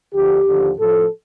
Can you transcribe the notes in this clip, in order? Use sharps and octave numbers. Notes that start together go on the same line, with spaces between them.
D2 D3 F3 G4
D#2 D3 F3
A2 F3 A4